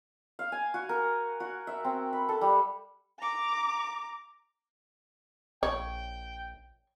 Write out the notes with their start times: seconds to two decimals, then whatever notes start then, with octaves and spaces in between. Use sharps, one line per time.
0.39 F5
0.52 G#5
0.74 F#4
0.89 A#4
1.40 F#4
1.67 E5
1.84 C4
2.13 B5
2.29 A4
2.41 G3
3.19 A#5 D6
5.63 A#1 C#5 G5